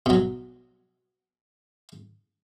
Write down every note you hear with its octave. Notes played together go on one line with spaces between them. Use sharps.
B2 F#3